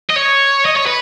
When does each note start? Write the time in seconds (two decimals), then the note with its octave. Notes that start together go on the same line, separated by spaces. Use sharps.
0.10 D#5
0.16 C#5
0.65 D#5
0.76 C#5
0.86 B4